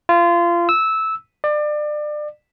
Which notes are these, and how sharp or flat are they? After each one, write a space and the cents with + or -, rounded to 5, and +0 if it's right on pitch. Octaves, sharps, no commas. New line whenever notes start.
F4 -25
E6 -15
D5 +30